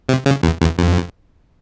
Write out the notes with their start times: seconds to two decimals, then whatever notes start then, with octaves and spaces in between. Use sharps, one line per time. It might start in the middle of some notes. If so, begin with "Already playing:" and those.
0.09 C3
0.26 C#3
0.43 E2
0.60 E2
0.78 F2